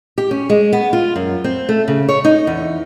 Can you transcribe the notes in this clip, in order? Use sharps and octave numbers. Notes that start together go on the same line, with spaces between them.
G4
C#4
G#3
B3
F4
F#2
C4
A3
C#3
C#5
D#4
E2